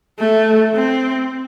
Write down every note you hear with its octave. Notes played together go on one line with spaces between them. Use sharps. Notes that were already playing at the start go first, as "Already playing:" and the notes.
A3
C4